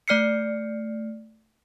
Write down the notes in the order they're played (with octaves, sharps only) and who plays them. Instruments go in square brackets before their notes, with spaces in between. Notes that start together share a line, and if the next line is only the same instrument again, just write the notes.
[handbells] A3 D5 F6 C7 C#7